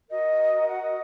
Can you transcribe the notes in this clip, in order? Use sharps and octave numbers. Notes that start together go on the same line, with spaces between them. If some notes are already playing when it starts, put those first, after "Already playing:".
F#4 A#4 D#5
F#5
D#5